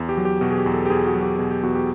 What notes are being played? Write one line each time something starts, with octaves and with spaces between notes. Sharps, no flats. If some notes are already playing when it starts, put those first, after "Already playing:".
Already playing: E2
G4
F#3
G4
B2 F#4
G#4
G4
E2
A4
G4
E2 G#4
F#4
F#3
G4
B2 G#4
G4
E2 F#4
G4